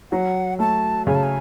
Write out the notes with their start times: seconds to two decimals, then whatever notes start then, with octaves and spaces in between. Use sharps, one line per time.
0.12 F#3 F#5
0.59 A3 A5
1.07 C#3 G#5
1.15 A5
1.23 G#5